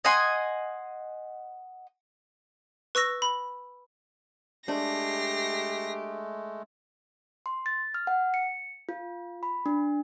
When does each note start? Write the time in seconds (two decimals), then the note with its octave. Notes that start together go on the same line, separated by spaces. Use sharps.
0.05 D#5 F#5 G#5 C6
2.95 B4 C#6 E6 A#6
3.22 B5
4.68 G#3 A3 D4 G4 A#6 C7
7.46 C6
7.66 A6
7.94 F6
8.07 F#5
8.34 C#7
8.89 F4
9.43 B5
9.66 D4